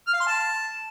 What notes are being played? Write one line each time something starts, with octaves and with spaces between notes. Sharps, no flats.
F6
F5
C6
A5